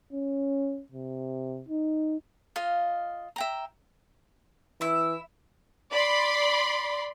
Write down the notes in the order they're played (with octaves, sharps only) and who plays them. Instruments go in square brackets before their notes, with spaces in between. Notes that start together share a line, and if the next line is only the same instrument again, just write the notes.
[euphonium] C#4
C3
D#4
[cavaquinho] F4 D#5 F5
E5 G5 A#5
[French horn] E3 [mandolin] E4 E5
[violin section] D5 B5 C6